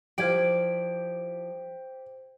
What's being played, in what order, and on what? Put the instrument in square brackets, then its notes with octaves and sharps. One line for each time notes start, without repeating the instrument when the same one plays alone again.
[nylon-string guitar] F3 E4 D5 [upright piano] G4 [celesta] C5 G#6 D7